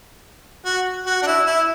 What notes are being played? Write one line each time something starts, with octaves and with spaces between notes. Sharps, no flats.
F#4
F#4
D4
E4
E4